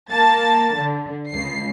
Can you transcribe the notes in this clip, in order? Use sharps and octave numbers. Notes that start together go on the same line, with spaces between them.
A#3 A5 A6
D3
C#2 C7